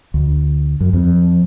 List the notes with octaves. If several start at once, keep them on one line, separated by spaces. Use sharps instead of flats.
D2
F#2
F2